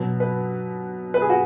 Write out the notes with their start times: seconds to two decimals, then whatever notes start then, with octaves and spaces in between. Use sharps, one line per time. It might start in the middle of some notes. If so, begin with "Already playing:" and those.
Already playing: B2 F#3
0.20 B4
1.14 B4
1.22 G#4
1.30 F#4